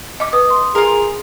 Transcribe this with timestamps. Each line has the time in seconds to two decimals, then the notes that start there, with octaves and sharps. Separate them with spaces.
0.20 D#5 D6
0.33 B4 D#6
0.50 C6
0.75 F4 G#4 A#4